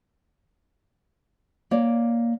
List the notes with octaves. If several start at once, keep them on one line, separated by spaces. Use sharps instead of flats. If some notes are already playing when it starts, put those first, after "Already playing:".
A#3 C#5 D5